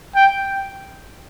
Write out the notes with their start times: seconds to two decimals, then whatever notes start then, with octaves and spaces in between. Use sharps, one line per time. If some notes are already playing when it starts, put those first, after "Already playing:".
0.16 G5